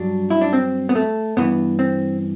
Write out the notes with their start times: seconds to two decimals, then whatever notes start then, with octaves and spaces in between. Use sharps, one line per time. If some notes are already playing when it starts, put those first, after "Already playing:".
Already playing: G2 F#3 D4
0.30 E4
0.41 D4
0.53 C4
0.89 B3
0.95 A3
1.37 G2 E3 B3
1.79 C4